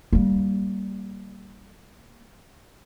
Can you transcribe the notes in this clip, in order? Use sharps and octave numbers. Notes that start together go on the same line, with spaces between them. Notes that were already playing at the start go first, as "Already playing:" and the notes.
G3 A#3